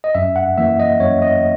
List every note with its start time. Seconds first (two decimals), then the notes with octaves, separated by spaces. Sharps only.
0.04 D#5
0.15 F#2 E5
0.36 F#5
0.57 E3 A#3 E5
0.80 D#5
1.00 F#2 C#5
1.22 D#5